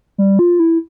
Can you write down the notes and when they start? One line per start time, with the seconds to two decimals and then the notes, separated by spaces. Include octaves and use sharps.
0.18 G3
0.39 F4
0.59 E4